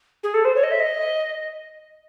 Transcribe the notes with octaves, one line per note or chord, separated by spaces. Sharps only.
G#4
A4
C5
C#5
D#5
E5
D#5